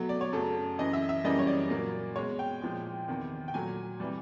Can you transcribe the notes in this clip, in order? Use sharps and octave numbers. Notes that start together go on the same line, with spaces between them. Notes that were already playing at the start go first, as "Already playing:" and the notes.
Already playing: B2 F#3 A3
D5
C#5
F#2 C#3 F#3 A3 A4
F#2 C#3 E3 D#5
E5
E5
F#2 C#3 E3 G3 A#3 D#5
C#5
D5
A#2 F#3 A#3
B2 G#3 C#5
G5
A#2 F3 G#3
E2 C3 D#3
G5
A#2 F#3 A3 G#5
C3 E3 G3